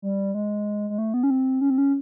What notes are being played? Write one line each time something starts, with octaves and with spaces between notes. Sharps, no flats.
G3
G#3
G#3
A3
B3
C#4
C4
C#4
C4
C#4